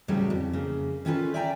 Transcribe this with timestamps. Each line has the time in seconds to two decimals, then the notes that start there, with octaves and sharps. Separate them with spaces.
0.08 D2 A2 C#3 F#3 G3 B3
0.30 F2
0.53 C#3 A#3
1.05 D#3 C#4 F4 A4 B4
1.34 D5 E5 G5 G#5 A#5